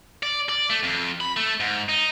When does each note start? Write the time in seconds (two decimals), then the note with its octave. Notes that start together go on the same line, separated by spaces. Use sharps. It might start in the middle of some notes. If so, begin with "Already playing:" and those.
0.23 D5
0.49 D5
0.70 A3
0.83 F2
1.21 B5
1.37 A3
1.60 G#2
1.89 D#4